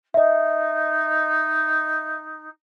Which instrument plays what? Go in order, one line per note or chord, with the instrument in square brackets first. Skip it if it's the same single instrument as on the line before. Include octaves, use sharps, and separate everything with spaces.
[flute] D#4 [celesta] D#5 E5